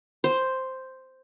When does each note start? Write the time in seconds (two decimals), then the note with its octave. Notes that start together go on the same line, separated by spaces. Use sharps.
0.24 C5